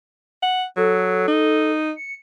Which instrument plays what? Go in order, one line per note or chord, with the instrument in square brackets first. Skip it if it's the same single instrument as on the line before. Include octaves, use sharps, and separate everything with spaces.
[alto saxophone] F#5
[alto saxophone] F#3 [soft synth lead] A4
[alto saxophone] D#4
[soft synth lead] C#7